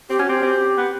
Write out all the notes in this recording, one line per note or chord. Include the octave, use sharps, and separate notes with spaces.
C4 G4
C#4 F#4
C4 G4
C4
B3